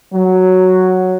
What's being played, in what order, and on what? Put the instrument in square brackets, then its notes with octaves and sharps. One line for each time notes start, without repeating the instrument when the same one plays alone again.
[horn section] F#3